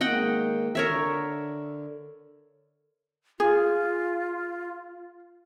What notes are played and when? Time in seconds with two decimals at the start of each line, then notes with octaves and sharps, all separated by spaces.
0.01 G#2 D#3 A#3 D#5 F#5 G5
0.75 D3 A#4 C#5 E5
3.40 F4 G#4